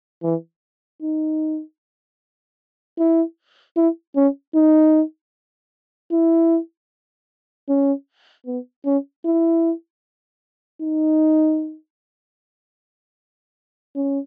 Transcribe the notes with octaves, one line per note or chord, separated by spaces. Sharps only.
E3
D#4
E4
E4
C#4
D#4
E4
C#4
B3
C#4
E4
D#4
C#4